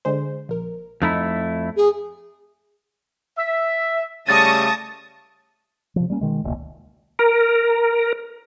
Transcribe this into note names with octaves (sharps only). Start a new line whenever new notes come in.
D3 G#3 C5
A#1 A#4
F2 A3 D#4 E4
G#4
E5
C#3 G3 A3 A5 C#6 D#6 A6 A#6
C3 F3
G3 A#3 C#4
B2 D#3 G#3
E1 C#2 A#3
A#4